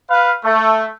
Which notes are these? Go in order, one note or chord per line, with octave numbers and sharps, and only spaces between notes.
B4 F5
A3